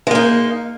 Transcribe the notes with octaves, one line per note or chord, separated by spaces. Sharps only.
G#3 A#3 D#4